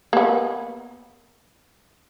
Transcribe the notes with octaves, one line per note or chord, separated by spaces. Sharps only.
A#3 B3